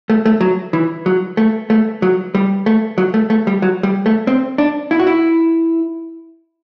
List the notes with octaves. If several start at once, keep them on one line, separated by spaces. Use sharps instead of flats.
A3
A3
F#3
E3
F#3
A3
A3
F#3
G3
A3
F#3
A3
A3
G3
F#3
G3
A3
C4
D4
E4
F#4
E4